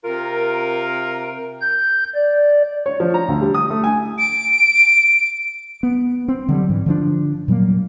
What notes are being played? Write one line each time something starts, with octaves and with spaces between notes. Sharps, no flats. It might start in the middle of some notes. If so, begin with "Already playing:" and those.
C3 F4 A#4
G6
D5
C#5
F3
A#5
D2
G3
D#6
A3
G#5
D7
B3
C4
D3 F#3 G3
G#2 E3
D3 F3 D4
A#2 F#3 G3 A#3